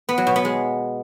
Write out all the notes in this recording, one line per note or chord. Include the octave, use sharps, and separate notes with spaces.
B3
F#3
B2
B3
G#3